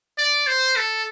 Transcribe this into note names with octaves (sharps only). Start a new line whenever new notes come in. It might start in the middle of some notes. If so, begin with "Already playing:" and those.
D5
C5
A4